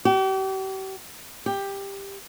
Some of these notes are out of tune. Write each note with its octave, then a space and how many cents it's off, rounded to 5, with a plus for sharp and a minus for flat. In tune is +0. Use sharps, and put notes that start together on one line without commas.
G4 -40
G4 +10